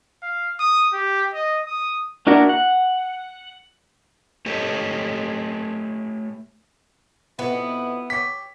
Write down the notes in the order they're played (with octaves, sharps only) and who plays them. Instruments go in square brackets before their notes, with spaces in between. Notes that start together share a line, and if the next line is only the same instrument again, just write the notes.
[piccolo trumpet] F5
D#6
G4
D#5
D#6
[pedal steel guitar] A#3 D4 E4 F#4 A#4
F#5
[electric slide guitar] A3 G4 A4 C#5 D#5
[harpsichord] F2 B2 B4 [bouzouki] B3 [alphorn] E4
[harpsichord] G4 C#5 [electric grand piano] B6